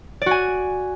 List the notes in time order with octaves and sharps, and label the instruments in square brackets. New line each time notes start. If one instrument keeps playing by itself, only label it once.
[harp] D5
F#4
G#5